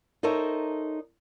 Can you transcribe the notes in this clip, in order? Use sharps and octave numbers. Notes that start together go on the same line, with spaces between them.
D#4 A4 A#4 C5 C#5 E5